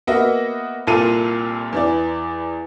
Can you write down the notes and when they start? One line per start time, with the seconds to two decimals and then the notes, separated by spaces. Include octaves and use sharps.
0.07 A#3 B3 F#4 D#5 E5
0.87 C2 A#2 F4 A4 D#7
1.72 E2 E3 D5